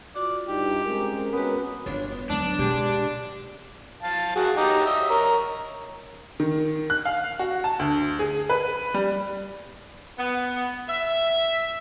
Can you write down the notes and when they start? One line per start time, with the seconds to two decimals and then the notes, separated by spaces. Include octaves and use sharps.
0.16 F4 F#4 D5
0.48 G2 D#4 G4
0.85 G#3 C4 C#4 A#4 G#5
1.33 G#3 B3 C#4 F#4 A#4 B4
1.86 G1 D4 F4 C#5
2.12 B3
2.30 D2 F#3 D4
2.59 B2 G#3 G4
4.03 F5 A5
4.36 F#4 G#4
4.57 D#4 G4
4.86 D#5 E5
5.10 A#4 C#5
6.40 D#3
6.90 F#6
7.05 F5
7.39 F#4
7.64 A5
7.79 D2
8.19 G#4
8.49 B4
8.94 G3
10.18 B3
10.89 E5